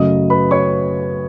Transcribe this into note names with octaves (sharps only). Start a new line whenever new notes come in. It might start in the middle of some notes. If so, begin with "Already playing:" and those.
Already playing: F#2 C#3 F#3 A3 D#5 D#6
B4 B5
C#5 C#6